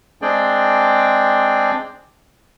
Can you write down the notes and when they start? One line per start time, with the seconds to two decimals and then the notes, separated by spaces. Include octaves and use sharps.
0.22 G#3 C4 D4 G#4 D5 G5